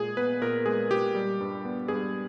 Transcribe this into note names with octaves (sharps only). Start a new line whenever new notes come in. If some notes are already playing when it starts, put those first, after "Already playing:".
Already playing: A#2 G#3 G#4
B3 B4
A#2 A#4
G#3 G#4
A#2 G4
G3
G2
B3
G2 G#4